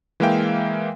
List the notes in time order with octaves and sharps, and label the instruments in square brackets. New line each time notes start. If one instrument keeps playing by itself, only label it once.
[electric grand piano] E3 G#3 A#3 E5 F5 G5